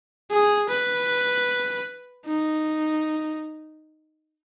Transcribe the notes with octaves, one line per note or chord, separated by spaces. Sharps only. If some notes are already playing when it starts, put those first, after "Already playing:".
G#4
B4
D#4